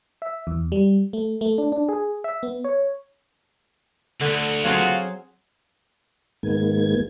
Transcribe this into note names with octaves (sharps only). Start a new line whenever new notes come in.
E5
E2
G3
A3
A3
D4
D4
G#4
E5
B3
C#5
D2 D3
F#3 C4 F4 F#4 G#4 F5
G#2 D#3 G#3 A#3 B3 G#6